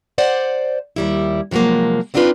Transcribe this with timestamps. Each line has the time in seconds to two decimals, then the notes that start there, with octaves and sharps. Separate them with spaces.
0.18 C5 D5 F#5
0.96 D#2 G3 E4
1.51 C3 F3 F#3 G#3 A#3
2.14 B3 C4 D4 D#4 F4 B4